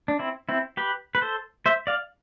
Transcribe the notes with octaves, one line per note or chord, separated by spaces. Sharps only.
D4
C4 E4
C4 E4
G4 B4
B4
A4 C5
C5 E5
D5 F5